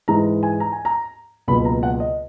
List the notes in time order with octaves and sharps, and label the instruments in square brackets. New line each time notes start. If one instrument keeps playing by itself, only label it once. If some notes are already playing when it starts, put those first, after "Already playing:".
[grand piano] G#2 E3 G#3 A#5
G#5
A#5
G#5
A#5
C#2 B2 F#3 A#3 B5
A#5
F#5
D#5